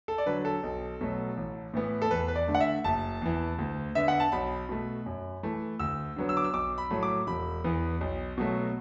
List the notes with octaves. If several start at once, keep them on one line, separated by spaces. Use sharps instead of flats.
A4
D5
D3 F#3 B4
A4
B1
B2 F#3 A3
A1
A2 E3 B3
A4
E2 B4
B4
D5
D3 A3
F#5
E5
F#1 A5
E2 E3
D2
D3 B3 E5
F#5
A5
B1 B5
B2 A3
F#2
E3 A3
D2 E6
D3 F#3 B3
E6
D6
E6
B1 D6
B5
A2 F#3 A3
D6
E1 B5
E2 E3 B3
B1
B2 F#3 A3